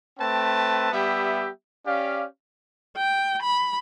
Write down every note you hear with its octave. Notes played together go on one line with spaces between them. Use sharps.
A3 C4 B4 G5 A5
G3 B3 G4 E5
C#4 G4 D5 F5
G5
B5